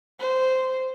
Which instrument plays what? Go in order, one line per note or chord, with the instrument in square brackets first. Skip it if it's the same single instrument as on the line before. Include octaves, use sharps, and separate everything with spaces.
[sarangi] C5